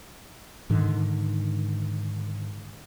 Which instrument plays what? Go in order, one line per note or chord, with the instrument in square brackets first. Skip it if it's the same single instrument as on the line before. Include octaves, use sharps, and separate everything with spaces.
[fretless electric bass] G#2 D3 D#3